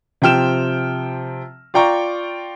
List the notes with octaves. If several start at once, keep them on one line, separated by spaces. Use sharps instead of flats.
C3 F3 G5 F6 E7
F4 D5 G5 A#5 C#6